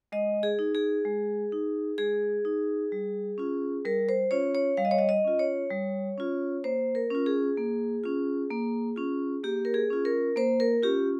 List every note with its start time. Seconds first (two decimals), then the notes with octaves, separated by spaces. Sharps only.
0.12 G#3 D#5
0.43 G#4
0.59 D#4
0.75 G#4
1.05 G#3
1.52 D#4
1.98 G#3 G#4
2.45 D#4
2.92 G3
3.38 C#4 F4
3.85 G3 A#4
4.09 C5
4.31 C#4 F4 C#5
4.55 C#5
4.77 G3 F5
4.85 D#5
4.91 C#5
4.98 D#5
5.09 D#5
5.24 C#4 F4
5.39 C#5
5.70 G3
6.18 C#4 F4
6.64 A#3 C5
6.95 A#4
7.10 C#4 F4
7.26 G#4
7.57 A#3
8.04 C#4 F4
8.51 A#3
8.96 C#4 F4
9.43 A#3 G4
9.65 A#4
9.74 G#4
9.90 C#4 F4
10.05 A#4
10.36 A#3 C5
10.60 A#4
10.83 C#4 F4 G4